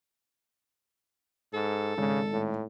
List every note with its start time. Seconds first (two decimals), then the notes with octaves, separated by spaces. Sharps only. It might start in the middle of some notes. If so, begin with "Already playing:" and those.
1.53 G#2 A4
1.98 G#1 C#3
2.32 A2